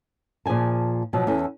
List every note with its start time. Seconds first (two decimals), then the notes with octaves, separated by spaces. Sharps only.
0.46 A#2 F3 G#4 G#5 A5
1.13 B2 F3 F#3 C4
1.27 E2 C#4 A4